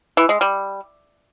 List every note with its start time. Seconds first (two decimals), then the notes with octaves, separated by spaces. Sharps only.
0.17 E3
0.29 G#3
0.41 G3